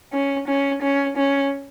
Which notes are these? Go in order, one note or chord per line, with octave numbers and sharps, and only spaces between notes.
C#4
C#4
C#4
C#4